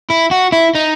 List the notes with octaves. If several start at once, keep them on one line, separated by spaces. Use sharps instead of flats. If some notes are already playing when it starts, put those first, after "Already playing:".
E4
F#4
E4
D#4